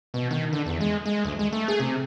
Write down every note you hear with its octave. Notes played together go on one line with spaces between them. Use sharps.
B2
D#3
D3
E2
G#3
G#3
D2
G#3
A3
G#4
C3